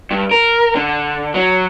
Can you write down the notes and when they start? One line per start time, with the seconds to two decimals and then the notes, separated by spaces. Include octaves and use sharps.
0.11 G2
0.31 A#4
0.76 D3
1.34 F#3